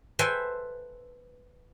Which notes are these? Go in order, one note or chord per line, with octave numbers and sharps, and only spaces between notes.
A4 B4 C5 E5 G5 G#5